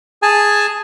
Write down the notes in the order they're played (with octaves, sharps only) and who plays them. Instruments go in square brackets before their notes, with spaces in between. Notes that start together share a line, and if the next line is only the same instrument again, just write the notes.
[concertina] G#4 G#5 A5